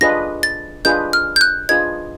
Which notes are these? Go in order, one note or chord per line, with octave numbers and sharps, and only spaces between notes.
D4 F4 G#4 B4 D#5 A#6
A6
D4 F4 G#4 B4 D#5 G6
F6
G6
F#6
D4 F4 G#4 B4 D#5 G#6